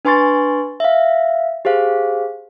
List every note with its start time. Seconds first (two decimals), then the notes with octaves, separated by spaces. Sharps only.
0.05 D4 B4 G#5 C6 C#6 A6
0.80 E5 F5
1.65 G4 G#4 C5 F5